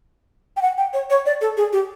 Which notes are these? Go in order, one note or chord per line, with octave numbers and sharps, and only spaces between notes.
G5
F#5
G5
C#5
C#5
D5
A4
G#4
G4